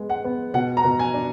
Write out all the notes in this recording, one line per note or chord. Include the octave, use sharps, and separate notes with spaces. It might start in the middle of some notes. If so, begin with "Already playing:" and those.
Already playing: G#3 B3
F#5
B3
B2 F#5
A#5
B2
G#5
D4